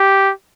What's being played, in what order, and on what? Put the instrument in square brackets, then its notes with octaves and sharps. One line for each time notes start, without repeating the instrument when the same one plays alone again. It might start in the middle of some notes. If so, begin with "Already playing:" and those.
Already playing: [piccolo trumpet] G4